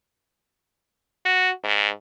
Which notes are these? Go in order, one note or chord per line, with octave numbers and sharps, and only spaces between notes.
F#4
G#2